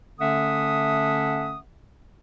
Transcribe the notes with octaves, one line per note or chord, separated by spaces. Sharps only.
D3 A3 C#4 E5 F#5 D#6